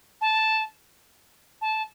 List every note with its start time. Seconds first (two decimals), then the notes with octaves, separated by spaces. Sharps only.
0.21 A5
1.61 A5